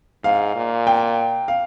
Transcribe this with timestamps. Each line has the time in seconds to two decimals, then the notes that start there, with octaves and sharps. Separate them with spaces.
0.24 G#2 F5
0.56 A#2
0.87 G5
1.48 F5